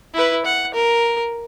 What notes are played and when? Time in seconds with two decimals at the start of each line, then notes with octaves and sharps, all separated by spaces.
0.14 E4 B4
0.46 F#5
0.75 A#4